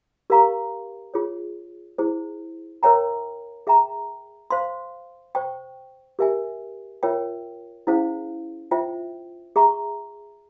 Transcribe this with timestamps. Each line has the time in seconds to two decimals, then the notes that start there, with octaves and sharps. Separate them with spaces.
0.30 G4 A#4 F5 A#5 C#6
1.14 F4 G#4 C#5
1.98 E4 G#4 C5
2.83 A#4 C#5 E5 G5 A#5
3.67 G#4 E5 G5 A#5
4.50 C5 F5 C6
5.35 C5 G5 C#6
6.19 G4 A#4 E5 G#5
7.03 F4 A#4 C#5 E5 G5
7.87 C#4 E4 G#4 C5 F5
8.71 F4 C5 E5 G5
9.56 G#4 E5 A#5 C#6